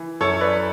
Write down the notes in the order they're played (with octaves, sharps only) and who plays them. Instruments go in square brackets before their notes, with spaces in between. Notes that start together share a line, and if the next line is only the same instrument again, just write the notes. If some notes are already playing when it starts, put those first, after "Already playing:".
Already playing: [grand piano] E3
F#2 A4 C#5
B4 D5